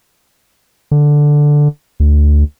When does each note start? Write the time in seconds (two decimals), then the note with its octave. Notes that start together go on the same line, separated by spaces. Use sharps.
0.91 D3
2.00 D2